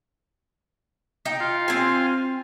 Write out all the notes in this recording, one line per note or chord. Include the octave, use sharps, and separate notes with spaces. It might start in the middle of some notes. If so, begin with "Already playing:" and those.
D#4 G5
F4
C4 G#5